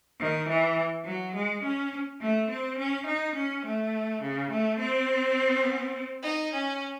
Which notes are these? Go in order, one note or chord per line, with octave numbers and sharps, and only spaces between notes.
D#3
E3
F#3
G#3
C#4
A3
C4
C#4
D#4
C#4
A3
C#3
A3
C4
D#4
C#4